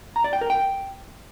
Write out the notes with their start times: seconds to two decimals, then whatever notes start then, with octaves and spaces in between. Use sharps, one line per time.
0.16 A#5
0.24 D5
0.33 G5
0.41 A#4
0.50 G5